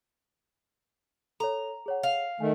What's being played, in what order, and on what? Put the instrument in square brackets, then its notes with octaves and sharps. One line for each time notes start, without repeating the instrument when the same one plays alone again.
[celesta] A4 C#5 [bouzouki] A#5
[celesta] G#4 C#5 F#5
[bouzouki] F5
[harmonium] D#3 A3 [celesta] G#5